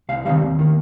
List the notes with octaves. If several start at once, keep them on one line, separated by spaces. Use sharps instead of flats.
C2 F5
C3 D#3 G3 F5
D#2
D#3 A#3